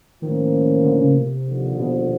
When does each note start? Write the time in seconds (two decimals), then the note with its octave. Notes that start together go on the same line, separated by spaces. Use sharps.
0.22 A2 D#3 F3 A#3 C#4
0.84 D3
1.00 C#3
1.16 C3
1.46 D#2 D3 F3
1.79 B2